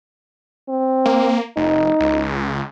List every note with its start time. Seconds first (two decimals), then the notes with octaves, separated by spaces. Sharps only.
0.69 C4
1.06 A#3
1.57 F1 D#4
2.00 C#2